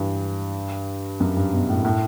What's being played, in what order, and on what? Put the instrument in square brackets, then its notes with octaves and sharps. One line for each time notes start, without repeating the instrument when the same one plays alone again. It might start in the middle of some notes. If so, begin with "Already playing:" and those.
Already playing: [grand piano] G2 E3
F#2
G2
B2
A2
A2